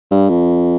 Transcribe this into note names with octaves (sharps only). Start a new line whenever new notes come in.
G2
F2